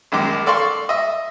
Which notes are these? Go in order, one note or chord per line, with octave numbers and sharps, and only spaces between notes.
A#1 F#2 D#3 G#3 D6
A4 D5 F5 C6 C#6
D#5 E5